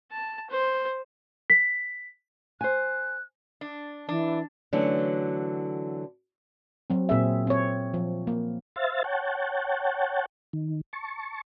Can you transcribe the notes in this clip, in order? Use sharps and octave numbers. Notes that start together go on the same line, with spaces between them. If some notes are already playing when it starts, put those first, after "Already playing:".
A5
C5
B6
C5 G#5 F#6
D4
E3 D4
D3 E3 F#3 A3 C#4
F#3 C4
A#2 C4 G#4 E5
C4 C#5
F3
A#3
C5 E5 F5 A6
C#5 F#5 G5 A5
D#3
A5 C#6